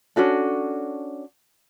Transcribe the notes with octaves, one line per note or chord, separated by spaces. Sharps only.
C#4 D4 F#4 A4